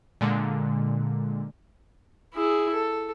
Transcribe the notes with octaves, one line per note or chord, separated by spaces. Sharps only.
A#2 D3 G#3
E4 G#4
A4